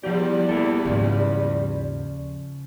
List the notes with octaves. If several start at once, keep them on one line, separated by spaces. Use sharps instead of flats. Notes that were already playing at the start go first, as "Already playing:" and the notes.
E2 F3 G3 G4 D5
A3 A#3 E4 A4
D#2 G#2 C#3 F3